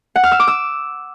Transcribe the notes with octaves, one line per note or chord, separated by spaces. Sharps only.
F#5
F6
E6
D6
E6